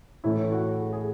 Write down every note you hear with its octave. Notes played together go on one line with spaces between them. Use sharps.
A2 E3 A3 C#4 E4
F#4
G#4
G#4